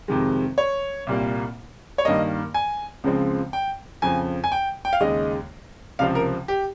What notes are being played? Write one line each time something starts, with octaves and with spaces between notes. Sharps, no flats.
F2 C3 D#3 G#3
C#5
C2 A#2 G3 A#3
C#5
G2 D#3 A#3 D#5
G#5
C#2 C#3 F3 G#3 C4
G5
F2 C#3 F3 G#5
G#5
G5
G5
F5
D#2 C#3 G#3 D#5
C#2 C3 F3 C4 F5
A#4
G4